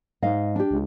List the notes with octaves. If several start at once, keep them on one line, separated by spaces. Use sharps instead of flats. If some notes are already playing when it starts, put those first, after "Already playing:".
G#2 D#5 F5
D4 G4
C#2